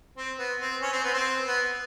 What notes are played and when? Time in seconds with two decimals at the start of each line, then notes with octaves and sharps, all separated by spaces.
0.17 C4
0.39 B3
0.60 C4
0.82 C#4
0.93 C4
1.03 B3
1.13 C4
1.47 B3